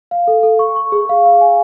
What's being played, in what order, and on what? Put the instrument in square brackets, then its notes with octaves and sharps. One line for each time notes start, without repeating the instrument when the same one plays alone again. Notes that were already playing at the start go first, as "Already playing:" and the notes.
[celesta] F5
A4
A4
C#6
C#6
G#4
F5
F5
G#5